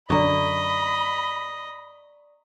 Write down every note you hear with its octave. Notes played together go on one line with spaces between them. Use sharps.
F#2 D3 D5 D#5 A#5 B5 C#6